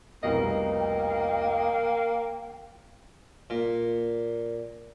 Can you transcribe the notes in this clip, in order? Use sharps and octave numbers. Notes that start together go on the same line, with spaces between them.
F1 C2 B2 A#3 D#5 G5
A#2